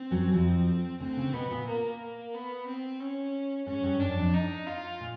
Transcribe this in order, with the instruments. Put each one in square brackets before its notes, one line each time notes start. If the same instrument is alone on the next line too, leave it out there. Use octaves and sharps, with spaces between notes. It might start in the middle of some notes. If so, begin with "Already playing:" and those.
Already playing: [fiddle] C4
[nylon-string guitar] F#2 F#3
F2 F3
[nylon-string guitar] D2 D3 [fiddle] C4
[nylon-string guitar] C#3
[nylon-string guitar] B2 [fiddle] B3
[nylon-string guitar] A#2
[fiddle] A#3
A#3
B3
C4
C#4
[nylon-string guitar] G#2 [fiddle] C#4
[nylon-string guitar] G2
[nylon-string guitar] F#2 [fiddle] D4
[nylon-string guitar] F2
[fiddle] D#4
F4
[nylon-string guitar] A#2